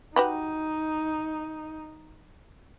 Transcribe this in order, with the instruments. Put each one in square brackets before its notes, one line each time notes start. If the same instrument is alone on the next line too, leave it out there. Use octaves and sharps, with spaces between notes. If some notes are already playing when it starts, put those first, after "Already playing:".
[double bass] D#4 [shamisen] F#4 G4 B4